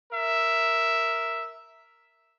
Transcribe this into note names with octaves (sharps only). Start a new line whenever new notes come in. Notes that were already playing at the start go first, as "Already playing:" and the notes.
A#4 E5